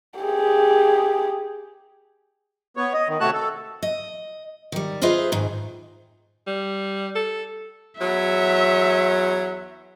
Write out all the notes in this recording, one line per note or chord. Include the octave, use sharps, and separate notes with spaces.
G4 G#4
B3 C#5
D#5
D#3
C3 A3 F#4 C#5 A5 F#6
A4
D#5
D#3 G3
F4 G#4 B4 C5 D#5 E5
G#2 D#3
G3
A4
E2 F#3 E5